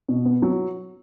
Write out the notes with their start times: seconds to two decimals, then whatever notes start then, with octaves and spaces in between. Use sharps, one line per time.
0.08 B2
0.25 B3
0.42 F#3